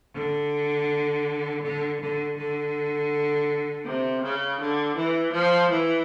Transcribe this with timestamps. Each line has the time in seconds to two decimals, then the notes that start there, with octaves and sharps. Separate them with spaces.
0.13 D3
1.62 D3
1.99 D3
2.36 D3
3.85 C3
4.22 C#3
4.60 D3
4.96 E3
5.34 F3
5.71 E3